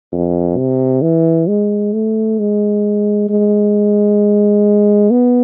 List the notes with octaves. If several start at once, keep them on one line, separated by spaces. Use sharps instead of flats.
F2
C3
E3
G#3
A3
G#3
G#3
B3